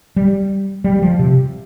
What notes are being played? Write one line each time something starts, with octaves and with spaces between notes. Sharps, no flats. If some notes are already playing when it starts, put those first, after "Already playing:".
G3
G3
G3
F3
C3